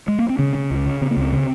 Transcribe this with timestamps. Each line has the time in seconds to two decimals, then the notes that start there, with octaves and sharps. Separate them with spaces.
0.08 G#3
0.19 A#3
0.29 C4
0.39 C#3 C#4
0.55 C#3
0.71 C#2
0.86 C#3
1.01 C#3 C4
1.11 A#3
1.17 C#2 C4
1.32 C#3